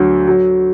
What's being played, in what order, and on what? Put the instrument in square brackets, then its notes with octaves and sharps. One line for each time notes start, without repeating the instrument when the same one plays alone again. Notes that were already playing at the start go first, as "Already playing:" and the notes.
Already playing: [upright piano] D2 F#3
F#3